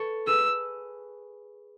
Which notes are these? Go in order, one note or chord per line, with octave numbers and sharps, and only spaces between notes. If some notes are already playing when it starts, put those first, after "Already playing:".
Already playing: A4 B4 C#5
G#4 B4 E6